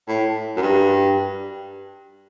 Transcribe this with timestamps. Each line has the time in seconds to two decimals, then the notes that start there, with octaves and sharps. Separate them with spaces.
0.08 A2
0.57 F#2
0.62 G2